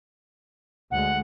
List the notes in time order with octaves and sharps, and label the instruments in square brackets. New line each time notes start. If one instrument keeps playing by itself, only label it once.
[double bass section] D2 G#3 [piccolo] F#5